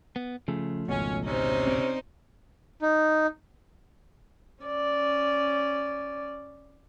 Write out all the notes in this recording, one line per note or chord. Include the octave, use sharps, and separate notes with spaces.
B3
C#3 F3 A3
G#1 C#2 B2 C#4
C3 C#4 D#4 C5
C4 D5
D#4
C#4 D5